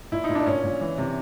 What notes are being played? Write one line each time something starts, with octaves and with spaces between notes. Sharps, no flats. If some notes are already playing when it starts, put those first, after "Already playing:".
A#2 E4
D#4
A#2
D4
A#2 C#4
A#2
E3
C3